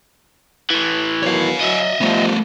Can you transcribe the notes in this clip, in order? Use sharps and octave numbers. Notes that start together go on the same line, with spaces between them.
A2 E3
D#3 F#3 B3 C#5 F5
F#3 D#5 E5
A#2 F3 G3 A3 B3